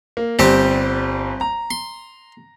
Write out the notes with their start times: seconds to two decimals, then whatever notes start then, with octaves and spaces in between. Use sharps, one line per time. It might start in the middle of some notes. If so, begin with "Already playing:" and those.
0.17 A#3
0.39 G1 G3 C4 G4 C5
1.41 A#5
1.71 C6